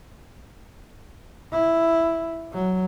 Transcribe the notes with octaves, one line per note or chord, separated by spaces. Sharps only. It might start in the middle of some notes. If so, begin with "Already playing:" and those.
E4
F#3